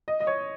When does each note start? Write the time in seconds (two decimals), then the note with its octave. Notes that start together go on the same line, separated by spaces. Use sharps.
0.08 D#5
0.20 D#5
0.27 C#5